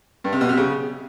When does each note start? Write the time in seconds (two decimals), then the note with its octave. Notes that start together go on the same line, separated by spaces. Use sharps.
0.24 G2
0.33 C3
0.41 B2
0.49 C3
0.57 C#3